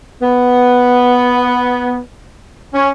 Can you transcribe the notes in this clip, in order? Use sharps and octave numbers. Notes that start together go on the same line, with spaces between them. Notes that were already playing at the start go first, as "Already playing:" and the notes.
B3
C#4